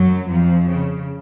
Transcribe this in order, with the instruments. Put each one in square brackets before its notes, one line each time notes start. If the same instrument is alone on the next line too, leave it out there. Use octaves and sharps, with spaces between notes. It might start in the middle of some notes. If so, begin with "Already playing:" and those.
Already playing: [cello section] F#2 F#3
F2 F3
C#3